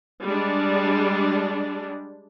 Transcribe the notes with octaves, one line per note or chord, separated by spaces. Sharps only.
G3 G#3 D4